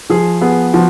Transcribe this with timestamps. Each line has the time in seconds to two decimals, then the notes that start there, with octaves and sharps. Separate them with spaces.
0.10 F3 G#4
0.41 B3 G#4
0.73 F3 F#4